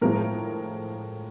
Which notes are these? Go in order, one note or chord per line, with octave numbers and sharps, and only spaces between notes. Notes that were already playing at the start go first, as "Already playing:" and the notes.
A2 F3 G#3 A#4